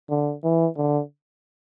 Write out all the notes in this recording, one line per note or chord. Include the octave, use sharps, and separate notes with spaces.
D3
E3
D3